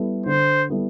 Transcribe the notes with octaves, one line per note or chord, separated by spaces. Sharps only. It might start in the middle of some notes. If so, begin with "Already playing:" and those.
Already playing: G3 B3 E4 A4
D3 C5
G3 B3 E4 A4